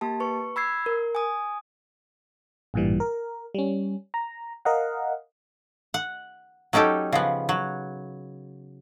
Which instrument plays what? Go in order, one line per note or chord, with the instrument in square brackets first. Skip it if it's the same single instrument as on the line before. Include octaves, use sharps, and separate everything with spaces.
[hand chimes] A#3 G4 A5
B4 C#6
B5 E6 G#6 C7
A#4
G#5 D#6
[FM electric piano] A1 G2 A#2 E3 G3
A#4
G3 C#4
A#5
A#4 D#5 F5 F#5
[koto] F#5
F#3 C#4 D#4 G4 A4
C#3 F3 B3
F#3